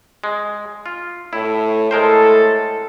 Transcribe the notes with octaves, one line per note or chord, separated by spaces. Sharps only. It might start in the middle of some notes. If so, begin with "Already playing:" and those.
G#3
F4
A2 E4
A2 G#3 A4 A#4 C5